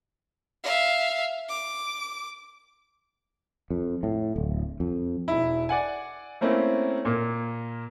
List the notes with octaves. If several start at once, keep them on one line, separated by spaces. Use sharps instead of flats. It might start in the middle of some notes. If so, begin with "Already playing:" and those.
E5 F5
D6
F2
A2
D1
F2
E1 E4
D5 F#5 G#5
A3 A#3 C4 C#4 E4
A#2 A#3